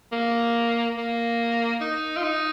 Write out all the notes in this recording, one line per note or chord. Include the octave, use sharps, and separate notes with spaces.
A#3
A#3
D#4
F4
D#4